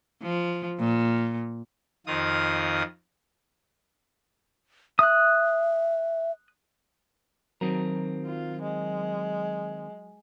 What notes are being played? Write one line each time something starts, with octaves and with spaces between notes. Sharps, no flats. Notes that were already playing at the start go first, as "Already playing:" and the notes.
F3
A#2
F2 D#3 F4 D#6
E5 D#6 F#6
D#3 F#3 C4 A#4
F4
G#3